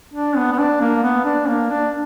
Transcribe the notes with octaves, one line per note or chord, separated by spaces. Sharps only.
D4
B3
B3
D4
A#3
B3
D4
A#3
D4